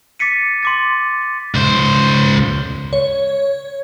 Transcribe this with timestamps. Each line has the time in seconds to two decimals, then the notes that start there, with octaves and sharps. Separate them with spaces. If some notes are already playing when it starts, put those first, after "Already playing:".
0.20 D6 A6 B6 C#7 D#7
0.63 C6 D6 A6
1.55 C#2 C5
2.93 C#5